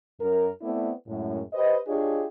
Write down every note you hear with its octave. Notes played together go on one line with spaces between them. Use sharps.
F#2 A#4
A3 B3 C4 E4 D5
F#2 A2 G#3
G4 B4 C5 D#5
D4 F4 G4 G#4 C#5 D#5